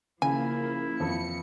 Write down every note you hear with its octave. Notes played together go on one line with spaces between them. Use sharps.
C#3 F3 A#3 E4 G#5
F2 E3 F3 C4 C#7